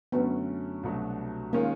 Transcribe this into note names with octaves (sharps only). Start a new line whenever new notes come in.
F#2 D3 F#3 A3 B3 C#4
C2 B2 F#3 A3 D4
D#3 G#3 A#3 C#4 F4